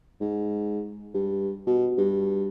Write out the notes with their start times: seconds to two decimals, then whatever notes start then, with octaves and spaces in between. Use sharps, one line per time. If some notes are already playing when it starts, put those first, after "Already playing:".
0.21 G#2
1.14 G2
1.67 B2
1.98 G2